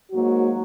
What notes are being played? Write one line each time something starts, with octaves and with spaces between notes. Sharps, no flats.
G#2 F#3 A#3 F#4